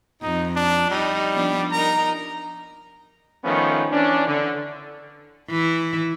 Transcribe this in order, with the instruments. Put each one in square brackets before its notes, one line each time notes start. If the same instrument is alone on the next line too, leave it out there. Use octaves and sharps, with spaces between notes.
[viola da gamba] F2 [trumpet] D#4
[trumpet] D4
[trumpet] G3 [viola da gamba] D#4
[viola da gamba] F3 B3 D4
[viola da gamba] D#4 A#4 [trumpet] A#5
[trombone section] D#3 F3 A3 B3 C#4
E3 C#4 D4
D3
[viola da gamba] E3 E4